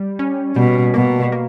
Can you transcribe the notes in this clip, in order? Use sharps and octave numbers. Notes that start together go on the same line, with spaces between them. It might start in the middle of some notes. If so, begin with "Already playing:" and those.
Already playing: G3
C#4
B2 G3
B2 A#3
A#3